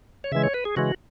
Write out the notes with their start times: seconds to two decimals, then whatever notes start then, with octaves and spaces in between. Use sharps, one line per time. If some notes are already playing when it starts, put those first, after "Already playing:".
0.24 C#5
0.32 C#3 E3 G#3 E5
0.43 C#5
0.54 B4
0.65 G#4
0.76 C#3 E3 G#3 F#4